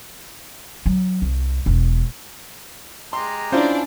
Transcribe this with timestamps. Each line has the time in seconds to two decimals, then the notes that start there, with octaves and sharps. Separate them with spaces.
0.86 F#3
1.22 C2
1.66 E1
3.13 G#3 G4 A#5 C6
3.52 C#4 D4 E4 F4 C5 D5